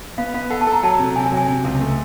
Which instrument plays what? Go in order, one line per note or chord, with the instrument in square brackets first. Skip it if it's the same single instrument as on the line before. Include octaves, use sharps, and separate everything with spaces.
[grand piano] B3 [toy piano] F5
[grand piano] B3 [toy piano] F5
[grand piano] A4 [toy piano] F#5
[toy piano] A5
[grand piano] A4
[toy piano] A#5
[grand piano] F#3 [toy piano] A5
[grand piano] C3
[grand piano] C3 [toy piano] G#5
[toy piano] G#5
[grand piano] F#3
[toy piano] G#5
[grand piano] C3
C#2
A3